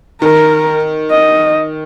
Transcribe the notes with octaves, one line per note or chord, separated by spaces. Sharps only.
D#3 A#4
D#5